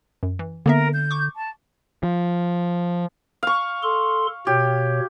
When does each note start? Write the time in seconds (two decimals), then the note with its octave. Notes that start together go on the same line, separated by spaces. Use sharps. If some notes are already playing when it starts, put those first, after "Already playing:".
0.23 F#2
0.39 E3
0.66 D3 A#3 B3 A#4 E5
0.94 G6
1.11 C#6 D6
1.36 A5
2.03 F3
3.43 F5 C#6
3.83 A4 C6
4.47 B2 G4 C#5